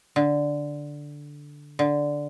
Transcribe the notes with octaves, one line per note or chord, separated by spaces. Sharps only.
D3
D3